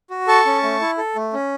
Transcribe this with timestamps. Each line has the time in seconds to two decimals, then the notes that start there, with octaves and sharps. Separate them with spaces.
0.10 F#4
0.27 A4 A5 C#6
0.46 C#4
0.63 A3
0.81 E4
0.98 A4
1.16 A3
1.33 C#4